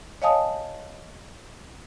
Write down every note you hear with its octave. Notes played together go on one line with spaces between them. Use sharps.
C#5 D#5 F5 G#5 A5 D#6